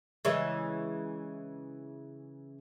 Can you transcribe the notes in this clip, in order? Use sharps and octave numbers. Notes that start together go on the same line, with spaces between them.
C#3 E3 G#3